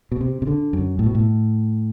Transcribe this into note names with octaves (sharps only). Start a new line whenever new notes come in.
B2
C3
C3
D3
F#2
A2
B2
A2